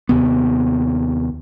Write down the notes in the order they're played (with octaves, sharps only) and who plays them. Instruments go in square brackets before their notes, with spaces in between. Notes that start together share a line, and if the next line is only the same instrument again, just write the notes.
[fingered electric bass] D#2 C3 B3